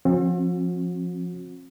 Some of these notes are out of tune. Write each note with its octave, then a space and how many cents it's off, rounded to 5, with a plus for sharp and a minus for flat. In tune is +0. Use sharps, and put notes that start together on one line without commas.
F3 +0 C4 +40 F#4 -45